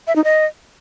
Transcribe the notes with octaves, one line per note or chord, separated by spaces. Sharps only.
E5
D#4
D#5